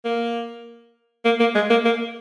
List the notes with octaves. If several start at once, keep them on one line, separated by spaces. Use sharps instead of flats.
A#3
A#3
A#3
G#3
A#3
A#3